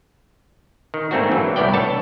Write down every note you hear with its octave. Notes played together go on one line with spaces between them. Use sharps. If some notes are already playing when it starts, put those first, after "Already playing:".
D#3
G#2 A3 A#3 C4 D4 F#4
E3 F#3
C2 A2 B3 E4 D5 G5
D4 A4 C#5 A5